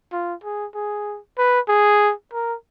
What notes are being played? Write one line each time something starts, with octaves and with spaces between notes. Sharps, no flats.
F4
G#4
G#4
B4
G#4
A#4